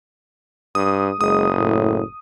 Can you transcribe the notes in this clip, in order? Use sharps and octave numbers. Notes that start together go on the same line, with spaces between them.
G2 D#6
F#1 G#3 D#6
A2